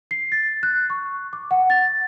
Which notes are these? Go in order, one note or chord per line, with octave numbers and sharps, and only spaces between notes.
C7
A6
F#6
C#6
D6
F#5
A6